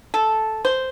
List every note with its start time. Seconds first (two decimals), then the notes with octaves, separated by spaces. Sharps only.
0.14 A4
0.65 C5